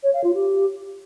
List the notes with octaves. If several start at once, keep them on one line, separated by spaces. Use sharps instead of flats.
C#5
F5
F4
G4